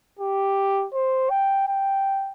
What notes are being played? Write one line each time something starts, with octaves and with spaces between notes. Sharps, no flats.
G4
C5
G5
G5